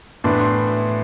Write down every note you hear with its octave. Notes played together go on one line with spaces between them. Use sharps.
A2 E3 B3 D4 C6
C6